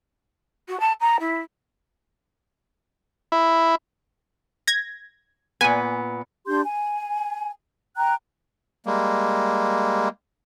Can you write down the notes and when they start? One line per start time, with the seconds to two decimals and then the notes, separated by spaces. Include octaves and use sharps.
0.68 F#4
0.80 A5
1.01 A#5
1.20 E4
3.32 E4
4.67 G#6 A#6
5.61 A#2 B3 G#5
6.47 D4 G4 C6 G6
6.63 G#5
7.96 G5 A#5 F#6
8.86 G3 G#3 A#3